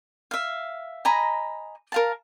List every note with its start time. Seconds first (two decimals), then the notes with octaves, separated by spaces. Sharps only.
0.31 E5 F5
1.05 D#5 G#5 A#5 B5
1.92 A#4 F5 A5